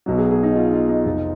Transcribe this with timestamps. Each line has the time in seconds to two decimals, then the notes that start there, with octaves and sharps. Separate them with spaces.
0.06 B1 B2 F#3
0.18 G#4
0.31 G#4
0.43 D#4
0.56 F4
0.72 F4
0.89 D#4
1.05 F1 F2 F3